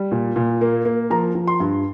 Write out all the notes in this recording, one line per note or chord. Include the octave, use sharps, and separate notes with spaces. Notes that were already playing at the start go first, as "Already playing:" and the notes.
Already playing: G3
A#2
A#2
A#3
A#3
F3 A#5
F3
C6
G2